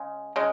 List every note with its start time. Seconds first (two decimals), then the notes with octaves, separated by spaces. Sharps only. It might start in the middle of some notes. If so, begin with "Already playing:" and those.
Already playing: C#3 G#3
0.36 C#3 G#3